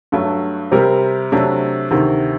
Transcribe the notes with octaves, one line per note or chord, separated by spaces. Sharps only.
G2 F#3 A3
C3 G3 C4 G4 A#4
C3 F#3 A3 D4
D2 C3 D#3